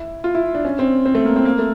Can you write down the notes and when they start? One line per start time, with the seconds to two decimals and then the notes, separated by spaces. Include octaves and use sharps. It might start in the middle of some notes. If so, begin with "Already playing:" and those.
Already playing: E4
0.24 F4
0.35 E4
0.55 D4
0.65 C#4
0.79 C4
1.06 C4
1.15 A3
1.25 A#3
1.36 C4
1.45 A#3
1.59 A3